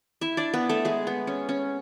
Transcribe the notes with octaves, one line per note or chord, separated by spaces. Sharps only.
E4 E5
D4 D5
B3 B4
A3 A4
G#3 G#4
B3
C#4
C#4